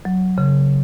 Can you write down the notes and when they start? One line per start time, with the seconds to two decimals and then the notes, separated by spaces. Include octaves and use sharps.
0.05 F#3
0.38 C#3